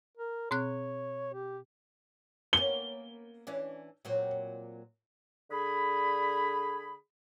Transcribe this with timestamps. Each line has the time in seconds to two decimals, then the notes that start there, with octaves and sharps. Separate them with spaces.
0.17 A#4
0.51 B2 C4 C#5 F#6
1.33 G4
2.53 A#3 B3 C#4 G7
3.47 E3 C#4 D4
4.05 A#2 F#3 C4
5.51 D3 G#4 B5